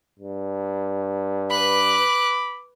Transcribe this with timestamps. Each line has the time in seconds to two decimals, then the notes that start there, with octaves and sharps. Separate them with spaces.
0.19 G2
1.51 B4 B5 D6 F#6